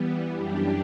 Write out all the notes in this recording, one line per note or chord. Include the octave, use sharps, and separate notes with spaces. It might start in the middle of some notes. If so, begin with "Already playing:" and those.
Already playing: E3 G3 B3
F#2 E3 G3 D4 G4